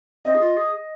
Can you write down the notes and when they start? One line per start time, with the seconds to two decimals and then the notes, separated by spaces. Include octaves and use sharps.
0.25 C4 D#5
0.35 G#4
0.41 F4
0.57 G#4